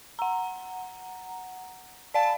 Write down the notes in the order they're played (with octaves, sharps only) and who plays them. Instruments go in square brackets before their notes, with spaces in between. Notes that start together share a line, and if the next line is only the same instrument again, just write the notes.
[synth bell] F#5 A#5
[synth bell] D5 F5 [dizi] A5